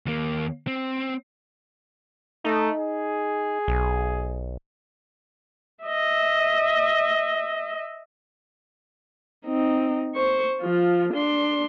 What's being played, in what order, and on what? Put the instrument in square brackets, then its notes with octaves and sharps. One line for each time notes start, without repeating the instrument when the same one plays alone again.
[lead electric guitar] D#2 A#3
C4
[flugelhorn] A3 [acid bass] D#4
[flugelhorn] G#4
[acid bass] B1
[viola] D#5 E5
C4 D#4
C5 C#6
F3 F4
D4 C6